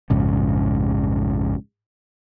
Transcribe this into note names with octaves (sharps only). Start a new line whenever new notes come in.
A#1 F2 G#2 C#3